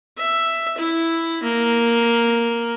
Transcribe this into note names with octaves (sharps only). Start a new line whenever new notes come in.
E5
E4
A#3